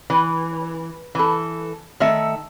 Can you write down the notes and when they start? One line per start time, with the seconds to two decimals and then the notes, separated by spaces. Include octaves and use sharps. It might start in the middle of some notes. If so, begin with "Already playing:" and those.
0.10 E3
1.15 E3 A4
2.00 D#3 A3 E5